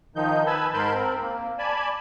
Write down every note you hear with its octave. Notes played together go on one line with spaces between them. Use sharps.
D#3 F3 D#4 G6
B4 G#5 A5 B5 E6
G#2 A#4 A5 B5 C6 G6
C4 A#4
A#3
D5 G#5 A5 B5